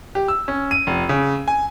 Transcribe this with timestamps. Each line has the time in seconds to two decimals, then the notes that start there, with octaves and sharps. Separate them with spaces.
0.15 G4
0.28 E6
0.48 C#4
0.71 D#7
0.87 F1
1.09 C#3
1.48 G#5